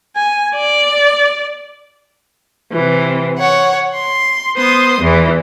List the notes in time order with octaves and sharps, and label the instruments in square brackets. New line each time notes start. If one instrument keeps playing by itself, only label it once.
[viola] G#5
D5
[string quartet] C3 E3
C#5 F#5
C6
B3 C5 C6 D#6
E2 E3